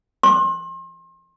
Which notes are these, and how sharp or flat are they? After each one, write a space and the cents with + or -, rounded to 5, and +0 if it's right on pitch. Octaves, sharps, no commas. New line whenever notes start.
C6 +35